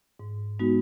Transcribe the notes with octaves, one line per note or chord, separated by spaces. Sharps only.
G#2
G#3 B3 D#4 F#4